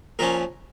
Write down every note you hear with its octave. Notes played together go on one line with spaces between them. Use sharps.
A#2 F3 C#4 A#4